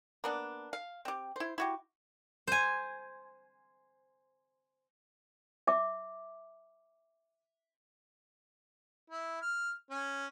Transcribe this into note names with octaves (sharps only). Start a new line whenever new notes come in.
A#3 B3 D4
F5
C4 G4
E4 C5
E4 F#4 G4
C5 G#5
E5 D6
E4
F6
C#4